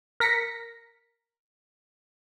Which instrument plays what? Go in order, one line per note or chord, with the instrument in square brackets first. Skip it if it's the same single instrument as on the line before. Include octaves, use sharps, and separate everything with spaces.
[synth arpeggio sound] A#4 A#6 B6 C#7